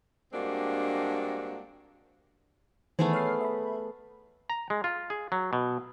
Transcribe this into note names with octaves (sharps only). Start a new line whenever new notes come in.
G2 G#3 A#3 C4 D4 F#4
D#3 E3 A3 B3 G#4 C5
C#5 F6 C7
E5 B5
A#5
G#3
F4
G#4
F#3
B2